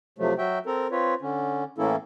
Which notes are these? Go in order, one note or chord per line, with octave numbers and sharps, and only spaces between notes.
C3 F3 F#3 A3
F#3 F#4 E5 G5
C4 A4 A#4
C4 F4 B4 C#5
D3 C#4
A2 E3 A#3 C#4 E4 A4